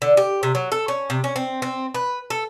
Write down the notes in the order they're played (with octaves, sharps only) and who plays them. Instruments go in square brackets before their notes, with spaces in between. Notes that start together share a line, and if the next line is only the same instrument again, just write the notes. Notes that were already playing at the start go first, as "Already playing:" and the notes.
[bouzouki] D3
G4
C3
F#3
A4
C#4
C3
C#4
C4
C4
B4
A4